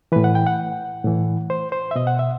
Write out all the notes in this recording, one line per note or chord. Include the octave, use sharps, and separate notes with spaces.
A2 E3 B4
F#5
G5
F#5
A2 E3
C5
C5
E5
B2 D#5
F#5
E5